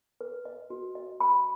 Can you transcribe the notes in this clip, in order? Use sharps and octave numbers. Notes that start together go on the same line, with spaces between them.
B4
D#5
F#4
D#5
B5